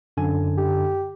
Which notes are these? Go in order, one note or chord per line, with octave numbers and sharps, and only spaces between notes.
F#2 D3 G#5
G4